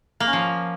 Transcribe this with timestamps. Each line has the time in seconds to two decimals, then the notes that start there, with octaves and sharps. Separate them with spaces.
0.20 A#3
0.27 C#4
0.33 F3